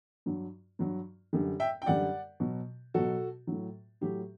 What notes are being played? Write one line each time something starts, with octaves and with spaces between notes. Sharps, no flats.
G2 F#3
G2 F#3
F#2 D3 G3
E5 G5
G5
F#2 D3 G3 D5 F#5
B2 F#3
B2 F#3 F#4 A4
A2 F#3
A2 F#3 G4